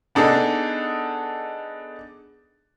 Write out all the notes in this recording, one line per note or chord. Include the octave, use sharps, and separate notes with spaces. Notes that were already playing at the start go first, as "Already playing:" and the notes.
B3 D4 D#4 G#4 A4